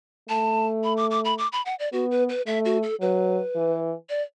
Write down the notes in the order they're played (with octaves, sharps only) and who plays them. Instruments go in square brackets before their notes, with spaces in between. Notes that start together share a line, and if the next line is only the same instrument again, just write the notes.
[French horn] A3 [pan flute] A5
[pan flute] B5
D6
D6
B5
D6
B5
F#5
D5
[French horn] B3 [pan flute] F#4
[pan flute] B4
B4
[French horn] A3 [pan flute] E5
[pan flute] F#4
A4
[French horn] F#3 [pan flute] B4
[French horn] E3
[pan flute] D5